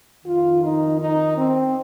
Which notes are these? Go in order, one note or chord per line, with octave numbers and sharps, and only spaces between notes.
F2 D#3 F4
D#4
D#4
C4